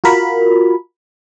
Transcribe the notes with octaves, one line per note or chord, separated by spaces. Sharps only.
F4 F#4 A#4 B5